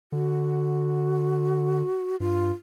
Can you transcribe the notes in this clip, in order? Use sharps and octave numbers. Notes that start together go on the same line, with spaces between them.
D3 F#4
G2 F4